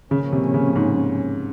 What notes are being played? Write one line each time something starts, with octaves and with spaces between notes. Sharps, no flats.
A2 C#3 F3 A#3 C#4
C3
C#3
G#2